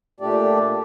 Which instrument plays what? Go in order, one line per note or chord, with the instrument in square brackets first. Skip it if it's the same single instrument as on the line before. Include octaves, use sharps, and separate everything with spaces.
[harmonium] A#2 A3 D4 G4 D5